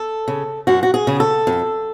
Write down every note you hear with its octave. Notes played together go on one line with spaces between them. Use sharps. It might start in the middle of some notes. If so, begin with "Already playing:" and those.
Already playing: A4
C#3
F#2 F#4
F#4
G#4
C#3
A4
F2